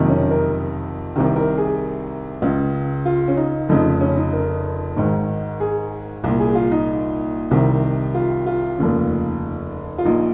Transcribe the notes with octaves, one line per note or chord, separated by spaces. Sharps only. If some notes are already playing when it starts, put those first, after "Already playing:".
Already playing: F#1 F2 C3 D#3
C#4
A#4
C2 C3 D#3
A#4
G#4
C#2 C#3
F4
C#4
D#4
F1 F2 C#3 D#4
C#4
D#4
A#4
G#1 G#2 D#3
G#4
C2 A#2
G#4
F4
D#4
C2 C3 D#3
F4
F4
F1 D#2 C#3
F4
A#1 A#2 D#4